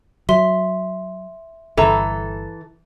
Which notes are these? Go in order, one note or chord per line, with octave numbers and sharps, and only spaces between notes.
F#3 E5 C6
G1 E3 A4 A#5